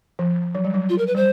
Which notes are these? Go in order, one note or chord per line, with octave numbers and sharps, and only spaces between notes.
F3
F#3
G3
F#3
F4
A#4
B4
G3 C5